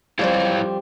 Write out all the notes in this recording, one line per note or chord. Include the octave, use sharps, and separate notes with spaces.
F2 G3 E4 C5 C#5 F5